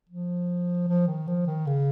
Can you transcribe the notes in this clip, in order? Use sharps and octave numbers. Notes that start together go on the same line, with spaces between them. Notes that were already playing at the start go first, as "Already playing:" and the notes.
F3
F3
D#3
F3
D#3
C#3